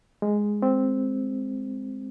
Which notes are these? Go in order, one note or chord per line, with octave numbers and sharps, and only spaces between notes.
G#3
C4